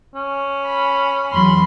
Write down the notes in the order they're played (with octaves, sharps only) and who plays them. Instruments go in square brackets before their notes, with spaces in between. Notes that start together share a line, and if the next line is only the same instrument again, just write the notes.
[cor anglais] C#4
[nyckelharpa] B5
[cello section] E2 F#3 [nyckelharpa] B5 C6